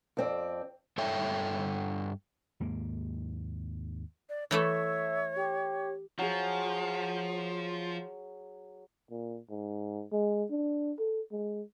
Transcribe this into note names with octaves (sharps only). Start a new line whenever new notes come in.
F2 C4 D5
G2 A4 C#5 E5 G5
D#2 G#2 A#3
D5
E3 A3 A4 C#5 E5
G4
F3 F#3 G#4
A#2
G#2
G#3
D4
A4
G#3